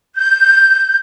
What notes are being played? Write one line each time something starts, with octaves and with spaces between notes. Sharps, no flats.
G6